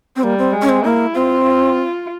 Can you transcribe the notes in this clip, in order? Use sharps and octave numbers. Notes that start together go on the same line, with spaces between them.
C4
G3 A#3
C4
G#3
C#4
C4
A#3 E4
C4 F4
F4